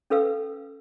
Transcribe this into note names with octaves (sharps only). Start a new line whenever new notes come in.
C#4 A4 B4 F5 E6